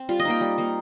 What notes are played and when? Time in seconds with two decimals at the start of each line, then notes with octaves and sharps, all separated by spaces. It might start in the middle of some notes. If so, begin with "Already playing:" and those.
Already playing: C4
0.09 G3 F4
0.20 D#5
0.25 A#3 D#4 G5
0.41 G3
0.58 A#3 D#4